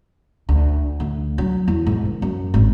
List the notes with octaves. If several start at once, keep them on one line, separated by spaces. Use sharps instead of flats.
D2
D2
F#3
E2
G#2
D#3
F#2
G#1